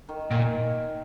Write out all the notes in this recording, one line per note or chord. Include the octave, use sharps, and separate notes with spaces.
D#3
A#2 D#3